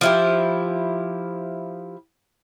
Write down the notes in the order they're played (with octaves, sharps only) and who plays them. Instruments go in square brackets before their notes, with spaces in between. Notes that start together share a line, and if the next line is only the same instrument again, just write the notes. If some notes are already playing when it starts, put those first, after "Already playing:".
[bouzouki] F3 E4 G4